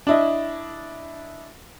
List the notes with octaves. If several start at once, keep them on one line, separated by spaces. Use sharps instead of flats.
D4 E4 D#5